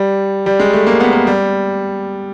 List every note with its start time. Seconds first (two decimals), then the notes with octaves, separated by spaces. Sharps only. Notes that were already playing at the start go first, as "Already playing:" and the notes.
Already playing: G3
0.46 G3
0.60 G#3
0.73 A3
0.87 A#3
1.00 B3
1.13 A#3
1.27 G3